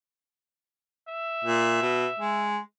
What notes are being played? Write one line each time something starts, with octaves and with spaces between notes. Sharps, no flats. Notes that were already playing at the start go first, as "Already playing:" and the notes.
E5
A#2
B2
G#3